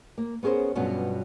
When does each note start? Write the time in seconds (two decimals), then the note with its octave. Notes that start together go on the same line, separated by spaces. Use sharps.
0.18 A#3
0.43 B3 C#4 G#4 A#4 C5
0.75 G2 B2 F3 F#3 B3 C#4